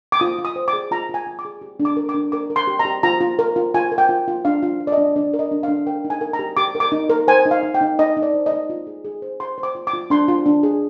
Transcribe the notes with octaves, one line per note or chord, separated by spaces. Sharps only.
D6
F4 D#6
F4
D#6
C5
D6
G#4
F4 A#5
F4 G#5
F4
D6
G#4
G4
D4
D6
A#4
D6
D4
A#4 D6
A#4
C6
G4
A#5
G4
F4 A#5
F4
A#4
F4
F4 G#5
A#4
G5
F4
F4
D4 F5
F4
F4
D5
D#5
D4
D4 D5
A#4
D#5
D4
D4 F5
A#4 G5
D#4
G#5
A#4
A#5
G4
G4 D6
A#4
D6
D#4
A#4
C5 G#5
D#4
F5
D#4
G5
D#4
D#4 D#5
D#4
D5
C5
D#5
D#4
F4
G#4
G#4
C5
C5 C6
C5
D6
F4
D6
F4
D4 C6
F4
D4
G#4